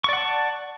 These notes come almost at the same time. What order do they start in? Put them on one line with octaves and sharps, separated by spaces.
C#6 D5 F#5 A5